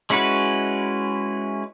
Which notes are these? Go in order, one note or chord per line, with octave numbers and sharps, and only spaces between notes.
G#3 C#4 E4 F#4 B4